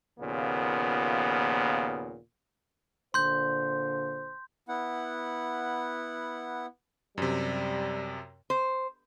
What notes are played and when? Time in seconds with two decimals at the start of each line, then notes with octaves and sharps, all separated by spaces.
0.19 D#2 A#2 C#3 F3 B3
3.14 A#2 D3 C5 C6 G6
4.68 B3 E4 F#5
7.18 F#2 C3 G3
8.50 C5